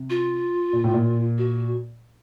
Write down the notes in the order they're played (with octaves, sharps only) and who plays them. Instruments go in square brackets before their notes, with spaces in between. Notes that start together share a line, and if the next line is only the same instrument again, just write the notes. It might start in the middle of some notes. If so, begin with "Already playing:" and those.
Already playing: [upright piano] C3
[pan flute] F4
[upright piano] A#2
A2
A#2
[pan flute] F#4